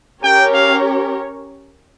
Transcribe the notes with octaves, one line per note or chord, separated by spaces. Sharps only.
C#4 G4 A#4 C#5 G5
F5